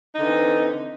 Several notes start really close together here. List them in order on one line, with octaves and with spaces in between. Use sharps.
D#4 D3 E3 C4